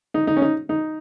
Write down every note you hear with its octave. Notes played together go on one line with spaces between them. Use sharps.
D#4
D#4
C#4
D#4
D#4